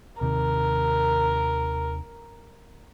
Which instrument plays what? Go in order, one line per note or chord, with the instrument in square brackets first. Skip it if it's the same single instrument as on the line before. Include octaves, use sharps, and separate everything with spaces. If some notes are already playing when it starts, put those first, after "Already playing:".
[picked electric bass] D#2 C3 D#3 [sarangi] A#4